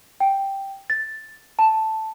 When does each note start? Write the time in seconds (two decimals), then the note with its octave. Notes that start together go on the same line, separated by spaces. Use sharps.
0.20 G5
0.90 A6
1.59 A5